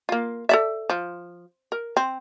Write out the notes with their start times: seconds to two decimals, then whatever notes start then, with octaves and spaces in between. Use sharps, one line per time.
0.09 A#3 F4
0.49 A4 D5 E5
0.90 F3
1.72 A#4
1.97 C4